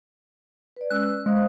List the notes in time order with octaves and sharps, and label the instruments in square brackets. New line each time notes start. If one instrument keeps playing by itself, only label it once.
[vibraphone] B4 D5
[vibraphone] G#3 C#4 E6 [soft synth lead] F#6
[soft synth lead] G#3 [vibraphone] C5 F5 D#6